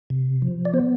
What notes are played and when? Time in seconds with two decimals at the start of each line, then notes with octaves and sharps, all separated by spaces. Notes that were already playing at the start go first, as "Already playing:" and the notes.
0.10 C3
0.42 F3
0.65 D5
0.73 B3 C5